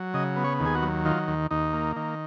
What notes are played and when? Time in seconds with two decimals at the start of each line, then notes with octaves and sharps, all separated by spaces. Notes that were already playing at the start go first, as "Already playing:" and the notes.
Already playing: F#3
0.14 C#3 D#5
0.36 B3
0.44 C#5
0.60 D#2
0.66 G#4
0.75 F#4
0.82 F#3
1.05 D#3 F4
1.28 D#2
1.51 D#2 D#4
1.73 A#3
1.96 D#3